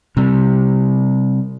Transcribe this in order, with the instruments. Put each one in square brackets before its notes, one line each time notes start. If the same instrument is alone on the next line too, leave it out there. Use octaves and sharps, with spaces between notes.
[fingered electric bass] C3 G3